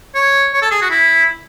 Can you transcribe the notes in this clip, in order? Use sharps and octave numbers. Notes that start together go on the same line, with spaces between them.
C#5
C#5
A4
G#4
F#4
E4